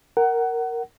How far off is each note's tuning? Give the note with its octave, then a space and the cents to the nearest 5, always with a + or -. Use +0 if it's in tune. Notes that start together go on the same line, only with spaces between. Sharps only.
A#4 -5 F#5 +25